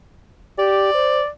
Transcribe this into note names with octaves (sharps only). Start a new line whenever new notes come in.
G4 D5
C5